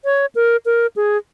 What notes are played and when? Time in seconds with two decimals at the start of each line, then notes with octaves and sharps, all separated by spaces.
0.05 C#5
0.35 A#4
0.65 A#4
0.96 G#4